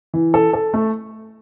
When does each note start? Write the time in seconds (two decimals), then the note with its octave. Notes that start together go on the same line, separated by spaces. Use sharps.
0.14 E3
0.34 A4
0.53 A4
0.74 A3